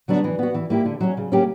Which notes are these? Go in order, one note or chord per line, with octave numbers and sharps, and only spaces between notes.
D3 F#3 B3 D4
E3
B3 F#4
E3
A#3 E4 G4
D3
F#3 C#4
C#3
F#3 A#3 C#4 G4